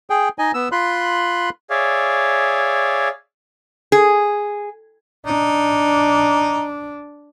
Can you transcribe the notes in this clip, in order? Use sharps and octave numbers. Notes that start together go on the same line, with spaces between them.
G#4 G5
D#4 D#5 G#5
B3 E6
F4 B5 C6 F#6
G#4 C#5 D5 E5 F5
G#4
D4 D#4